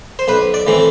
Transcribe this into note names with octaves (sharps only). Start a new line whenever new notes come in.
C5
B1 B4
D5
A2 E3 A3 C4